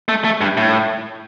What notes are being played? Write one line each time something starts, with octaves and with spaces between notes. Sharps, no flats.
A3
A3
G2
A2